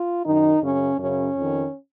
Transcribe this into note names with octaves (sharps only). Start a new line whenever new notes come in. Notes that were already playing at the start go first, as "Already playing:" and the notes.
Already playing: F4
F#2 D#3 D#4
F#2 C#3 C#4
F#2 C#3 C#4
F2 D#3